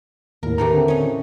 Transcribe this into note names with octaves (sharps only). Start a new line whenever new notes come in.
D#2 A2 A#4
A2 D#3 E3 G4 A#5
D3 C4
C#4 D#4